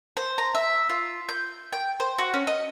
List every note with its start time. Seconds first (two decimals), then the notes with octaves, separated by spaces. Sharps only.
0.17 C5
0.38 A#5
0.55 E5
0.89 F4
1.29 G6
1.73 G5
2.00 C5
2.18 F#4
2.34 C#4
2.47 D#5